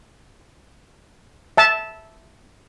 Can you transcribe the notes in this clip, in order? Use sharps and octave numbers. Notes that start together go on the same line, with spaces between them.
E5 A5